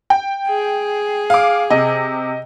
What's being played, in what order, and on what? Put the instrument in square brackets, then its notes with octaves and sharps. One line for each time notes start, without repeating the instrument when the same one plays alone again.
[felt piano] G5
[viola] G#4
[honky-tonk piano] F5 D6
[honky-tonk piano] C3 [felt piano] D#5